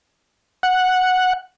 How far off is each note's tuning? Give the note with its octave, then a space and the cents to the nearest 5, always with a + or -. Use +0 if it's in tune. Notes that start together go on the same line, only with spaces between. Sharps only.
F#5 -5